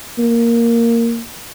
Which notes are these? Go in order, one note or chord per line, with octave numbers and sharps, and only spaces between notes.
A#3